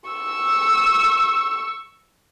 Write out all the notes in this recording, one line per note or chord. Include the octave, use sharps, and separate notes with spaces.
C#6 E6